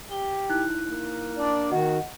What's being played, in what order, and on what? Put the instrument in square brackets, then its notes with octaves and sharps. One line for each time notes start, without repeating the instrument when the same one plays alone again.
[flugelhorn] G4 [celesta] G7
[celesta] D#4 E4 F#6
[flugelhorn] A#3
[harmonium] D4 D5
[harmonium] D#3 F#4 [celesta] D#5 F#5